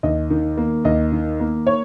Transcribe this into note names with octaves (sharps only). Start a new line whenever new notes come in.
D#2 D#5
D#3
A#3
D#2 D#5
D#3
A#3
C#5